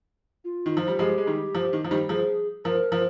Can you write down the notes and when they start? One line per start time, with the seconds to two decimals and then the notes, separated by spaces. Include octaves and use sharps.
0.44 F4
0.66 D#3
0.77 F3
0.88 G3
0.99 F3 G#3 G4
1.18 G#3
1.27 D#3 G3
1.55 F3
1.73 D#3
1.84 F3
1.91 D#3 G3
2.09 F3 G#4
2.64 F3 A#4
2.92 F3